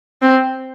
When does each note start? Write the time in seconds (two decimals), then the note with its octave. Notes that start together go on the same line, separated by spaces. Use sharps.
0.22 C4